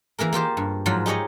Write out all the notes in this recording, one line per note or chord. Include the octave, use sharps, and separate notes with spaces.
E3 A#3 G#4 A#4
A#3 F4 G4 C5
G2
G#2 F3 F#3 F4
D#4 G4 G#4 C#5 D#5